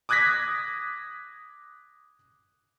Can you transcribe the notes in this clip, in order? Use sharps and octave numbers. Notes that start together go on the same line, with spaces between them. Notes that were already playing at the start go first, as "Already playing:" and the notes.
D6 D#6 F#6 G#6 A#6 B6